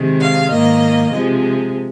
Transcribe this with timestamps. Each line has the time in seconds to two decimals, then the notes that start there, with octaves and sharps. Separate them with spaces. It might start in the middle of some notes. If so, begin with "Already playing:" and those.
Already playing: C3 D#3 G#3
0.20 F5
0.51 G#2 D#3 A#3 D#5
1.12 C3 F3 G#3